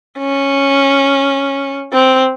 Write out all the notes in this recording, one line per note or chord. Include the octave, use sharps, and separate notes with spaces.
C#4
C4